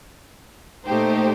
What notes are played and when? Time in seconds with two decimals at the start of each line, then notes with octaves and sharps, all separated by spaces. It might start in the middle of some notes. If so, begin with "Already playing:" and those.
0.85 A#2 A3 D#4 G4 C5